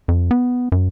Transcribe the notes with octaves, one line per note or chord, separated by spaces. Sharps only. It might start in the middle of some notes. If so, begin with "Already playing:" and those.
F2
B3
F#2